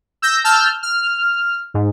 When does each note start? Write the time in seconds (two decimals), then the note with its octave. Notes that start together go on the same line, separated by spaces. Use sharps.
0.22 E6 G6 A#6
0.44 A5 E6 F6 G6
0.83 F6
1.74 G#2